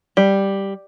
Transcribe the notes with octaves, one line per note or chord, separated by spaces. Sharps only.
G3